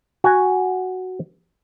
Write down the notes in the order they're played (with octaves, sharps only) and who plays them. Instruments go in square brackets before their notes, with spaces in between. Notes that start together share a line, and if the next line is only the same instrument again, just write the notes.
[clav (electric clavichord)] F#4 F#5 G#5